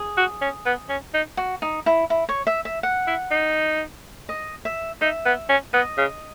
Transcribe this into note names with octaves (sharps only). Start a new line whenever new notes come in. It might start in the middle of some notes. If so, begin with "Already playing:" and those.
Already playing: G#4
F#4
C#4
B3
C#4
D#4
F#4
D#4
E4
E4
C#5
E5
E5
F#5
E4
D#4
D#5
E5
D#4 E5
B3
C#4
B3 D#5
C#3